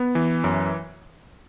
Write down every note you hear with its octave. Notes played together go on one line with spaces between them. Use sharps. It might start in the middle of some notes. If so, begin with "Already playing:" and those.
Already playing: B3
E3
F#2